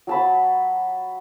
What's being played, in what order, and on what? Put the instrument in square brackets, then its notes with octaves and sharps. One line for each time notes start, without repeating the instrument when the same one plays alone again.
[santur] F#3 A5 B5